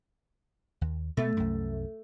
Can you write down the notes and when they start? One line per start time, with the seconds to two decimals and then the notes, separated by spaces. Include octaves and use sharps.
0.81 D#2
1.17 B2 A3 B3
1.37 C2 F#2